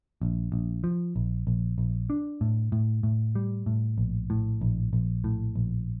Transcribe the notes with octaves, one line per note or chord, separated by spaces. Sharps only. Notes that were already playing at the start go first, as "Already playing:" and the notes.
A#1
A#1
F3
A#1
A#1
A#1
D4
A2
A2
A2
G3
A2
A#1
A2
A#1
A#1
A2
A#1